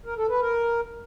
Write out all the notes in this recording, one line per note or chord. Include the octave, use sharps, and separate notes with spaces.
A#4
A4
B4
A#4